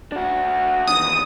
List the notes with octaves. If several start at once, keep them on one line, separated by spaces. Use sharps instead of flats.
D4 F#4
E2 D#3 D#6